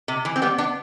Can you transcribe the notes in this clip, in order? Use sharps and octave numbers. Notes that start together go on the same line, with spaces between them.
C3
E3
C4
G3 B3
B3 D4